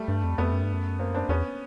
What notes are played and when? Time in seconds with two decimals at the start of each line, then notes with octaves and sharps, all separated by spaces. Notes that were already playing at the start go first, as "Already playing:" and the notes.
Already playing: G3 A3
0.08 G2
0.24 F2
0.38 F2 A3 B3
0.53 F#2
0.63 G2
0.73 F#2
0.99 A#3 C4
1.15 C4 D4
1.29 E2 B3 C#4